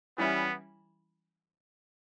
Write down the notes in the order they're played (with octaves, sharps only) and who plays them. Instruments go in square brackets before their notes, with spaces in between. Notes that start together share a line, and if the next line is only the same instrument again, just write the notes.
[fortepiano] E3 G3 C#4 E4 [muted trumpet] B3